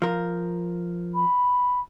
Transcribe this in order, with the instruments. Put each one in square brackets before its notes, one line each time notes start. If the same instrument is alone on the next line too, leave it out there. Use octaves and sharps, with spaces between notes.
[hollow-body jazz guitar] F3 A#4
[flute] B5